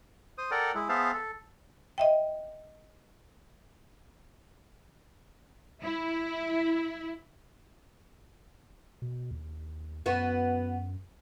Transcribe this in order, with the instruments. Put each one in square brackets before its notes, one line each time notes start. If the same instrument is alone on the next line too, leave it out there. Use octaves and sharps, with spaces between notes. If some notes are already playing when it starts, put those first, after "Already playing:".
[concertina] C5 D#6
A4 A#4 D5 F#5 G5
G#3 E4
B3 G#4 C5 E5 F5 A5
A4
[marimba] D#5 E5 G5
[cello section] E4
[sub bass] B2
D#2
[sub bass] F#2 [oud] B3 F#4